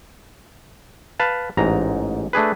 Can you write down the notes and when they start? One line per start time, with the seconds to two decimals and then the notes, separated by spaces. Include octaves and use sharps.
1.20 B4 F5 A5
1.57 A1 G#2 A#5
2.33 A3 D4 G#4 B4